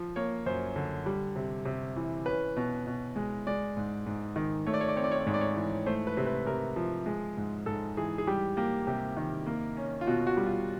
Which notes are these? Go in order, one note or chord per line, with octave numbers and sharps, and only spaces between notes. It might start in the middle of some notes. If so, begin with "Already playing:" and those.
Already playing: F3
A#3 C#5
F#2 C5
D3
G3
C3
C3
E3
C#4 B4
B2
B2
G#3
G#3 D5
G#2
G#2
D#3
A3 C#5
D5
C#5
D5
C4 C#5
D5
C#5
D5
G#2 C#5
D5
C#5
E3
A3 C5
B4
C3
B4
C3 A#4
F3
G#3
G#2
G#2 A4
E3 G#4
G#4
G3 G4
A#3 G4
C3 G4
D#3
A#3
C#4
F4
B2 F#4
F#4
G3
F4